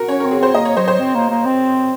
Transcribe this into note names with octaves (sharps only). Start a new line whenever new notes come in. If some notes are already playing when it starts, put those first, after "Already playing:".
Already playing: F#4 A#4
C#4 C#5
A#4
C4
G#4
C4 C5
A#3 D#5
C#5
F#3 C5
C5
C4
A#3
A#3
C4